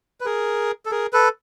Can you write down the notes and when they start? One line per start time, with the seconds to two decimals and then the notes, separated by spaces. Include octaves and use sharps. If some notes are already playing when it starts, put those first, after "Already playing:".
0.21 B4
0.26 G#4 A#4
0.86 A4
0.91 G#4 A#4
1.13 A4 B4